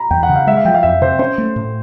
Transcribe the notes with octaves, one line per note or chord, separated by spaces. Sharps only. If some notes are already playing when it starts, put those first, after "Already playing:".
Already playing: A#5 B5
E2 G5
F#5
C#3
F5
G#3 E5
F5
F3 G5
F5
F2 E5
C3 C5
C#4 C5
A3
A2